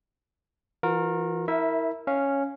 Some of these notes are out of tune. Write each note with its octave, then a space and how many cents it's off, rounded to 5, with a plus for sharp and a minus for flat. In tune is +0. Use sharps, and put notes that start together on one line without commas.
E3 +20 F#4 -45 A#4 +0
E4 -25 A#4 -10 E5 +0
C#4 +0 F5 -5